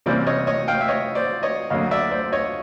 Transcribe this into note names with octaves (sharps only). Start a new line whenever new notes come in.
C3 E3 G3 A#3 C#4 C5 D5
C#5 D#5
C#5 D#5
F5 G5
E5
C#5 D#5
C5 D5
C#5 D#5
D2 D3 F#3 A#3 D#5 F5
D5 E5
C5 D5
C#5 D#5